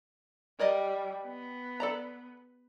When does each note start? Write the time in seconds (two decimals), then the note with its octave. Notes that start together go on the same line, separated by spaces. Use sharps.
0.59 G3 A#4 D5 D#5
1.24 B3
1.80 A4 D5 A#5